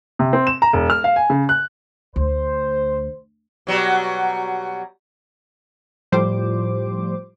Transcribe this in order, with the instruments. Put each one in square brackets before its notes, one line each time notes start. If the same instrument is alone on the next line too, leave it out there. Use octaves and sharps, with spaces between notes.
[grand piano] C3
C4
E7
A#5
E1
F6
F5
G#5
C#3
F#6
[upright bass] D2 [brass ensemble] C5
[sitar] B2 F#3 G3
[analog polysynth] A2 F3 G3 C5 D6